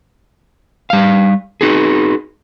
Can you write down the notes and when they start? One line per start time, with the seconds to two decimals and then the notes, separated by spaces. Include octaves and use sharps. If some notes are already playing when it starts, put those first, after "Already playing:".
0.90 G3 F5
1.61 D#4 F#4 G#4